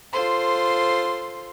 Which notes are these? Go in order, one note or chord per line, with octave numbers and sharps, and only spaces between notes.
F4 A4 C5 C6